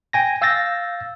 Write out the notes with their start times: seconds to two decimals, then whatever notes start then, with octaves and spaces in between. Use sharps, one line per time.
0.13 G5 G#5 A#6
0.42 F5 E6 G6 A6 A#6